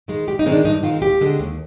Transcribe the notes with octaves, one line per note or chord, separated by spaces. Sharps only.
D#3 G#3
G2 G4
D#4
D#3 G#3 C4
D4
G2 D#4
D#3 G#3 C4 F4
D#2 G4
D3 G#3 C4
D#2